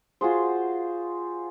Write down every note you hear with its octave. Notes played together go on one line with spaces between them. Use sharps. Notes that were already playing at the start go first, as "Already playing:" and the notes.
F4 F#4 G#4 C5